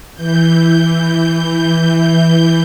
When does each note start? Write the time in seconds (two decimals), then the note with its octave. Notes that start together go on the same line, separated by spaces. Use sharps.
0.15 E3 G6